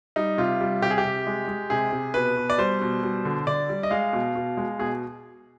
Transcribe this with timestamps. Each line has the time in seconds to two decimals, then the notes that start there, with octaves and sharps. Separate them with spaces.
0.16 G3 D#4
0.38 C3 F4
0.61 G3
0.82 C3 G4
0.90 G#4
0.98 G4
1.04 C3
1.27 G#3
1.48 G#3
1.70 C3 G#4
1.92 C3
2.14 B2 B4
2.37 B2
2.50 D5
2.58 G3 C5
2.81 B2
3.03 G3
3.25 D3
3.47 D3 D5
3.69 G3
3.83 D#5
3.90 G#3 F5
4.13 B2
4.35 B2
4.57 G#3
4.79 B2 G#4